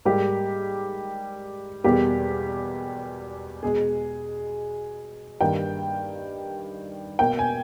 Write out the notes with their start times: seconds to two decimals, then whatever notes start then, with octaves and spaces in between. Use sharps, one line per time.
0.05 G#2 G3 A#3 G4
1.84 E2 B2 G3 A#3 G4
3.63 B2 G#3 G#4
5.41 G2 D#3 A#3 G5
7.19 B2 A#3 G5
7.39 G#5